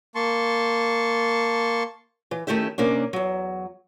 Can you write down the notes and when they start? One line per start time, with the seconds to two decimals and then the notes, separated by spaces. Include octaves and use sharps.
0.15 A#3 A5 C6 C#6
2.31 E3
2.47 D#3 A3 C#4 E4 G4 E5
2.78 C3 A#3 C#4 D4
3.13 E2 F#3